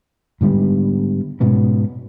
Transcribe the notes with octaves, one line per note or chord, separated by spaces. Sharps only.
G#2 D3 G3 B3
G#2 B2 B3 C#4